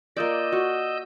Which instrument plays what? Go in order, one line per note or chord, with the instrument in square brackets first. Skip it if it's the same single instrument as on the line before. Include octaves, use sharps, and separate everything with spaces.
[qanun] A#3 F4 D5 [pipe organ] D#5 E6 G6
[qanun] F#4